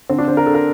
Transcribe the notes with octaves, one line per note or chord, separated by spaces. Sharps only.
D3 C4
D4
D3 C5
A#4
D3 A4
A#4